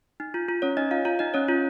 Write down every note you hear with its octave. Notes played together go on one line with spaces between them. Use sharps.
D#4
F4
F4
C#4 C#5
D#4 D#5
F4 F5
F4 F5
D#4 D#5
C#4 C#5
F4